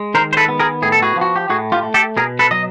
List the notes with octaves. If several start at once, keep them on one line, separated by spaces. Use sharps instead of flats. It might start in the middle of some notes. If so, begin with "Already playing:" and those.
Already playing: G#3
D#3 A#4 C5
C5
A4 B4
B3
G#4 A#4
A2 G#4
A4
F#4 G#4
F3
F#4
G4
A2 F#4 G#4
F4 G4
A3
G4 A4
B2 G#4 A#4
A4 B4
F#3 D#5